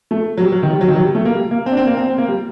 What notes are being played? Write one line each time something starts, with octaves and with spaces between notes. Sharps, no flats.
A3
F#3
G3
F#3
D#3
G3
F#3
D#3
F#3
G3
A3
A#3
G3
A#3
C4
D4
C4
A#3
C4
C4
A#3
G3